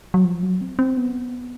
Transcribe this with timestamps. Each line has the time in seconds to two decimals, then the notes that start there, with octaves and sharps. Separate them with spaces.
0.14 F#3
0.25 F3
0.43 F#3
0.61 C4
0.79 C4
0.97 B3